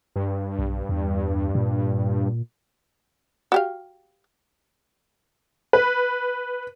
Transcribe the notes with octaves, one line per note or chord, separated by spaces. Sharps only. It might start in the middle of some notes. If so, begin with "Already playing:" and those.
G2
B1
E2
A#2
F#4 G4 F5
B4